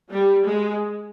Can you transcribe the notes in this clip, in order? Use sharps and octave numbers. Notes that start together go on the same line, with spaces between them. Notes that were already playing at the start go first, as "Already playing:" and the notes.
G3
G#3